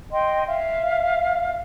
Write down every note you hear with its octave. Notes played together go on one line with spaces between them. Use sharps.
D#5 G5 C6
E5 F5